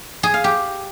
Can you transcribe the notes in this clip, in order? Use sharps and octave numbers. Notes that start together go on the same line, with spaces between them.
G#4
F5
G4